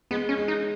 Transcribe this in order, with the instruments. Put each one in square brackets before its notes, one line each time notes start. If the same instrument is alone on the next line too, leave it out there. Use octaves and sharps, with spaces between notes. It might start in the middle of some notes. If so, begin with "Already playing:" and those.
[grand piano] G#3 [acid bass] B3
[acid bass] C#4
[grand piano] G#3
[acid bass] D#4